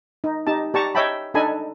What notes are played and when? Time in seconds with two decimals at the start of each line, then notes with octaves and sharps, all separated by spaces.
0.24 D#4
0.47 D#4 G4 A5
0.74 G4 D5 A5 A#5 C#6
0.95 C#5 D#5 E5 G5 A5 B5
1.34 D4 D#4 A4 D#5 G#5 B5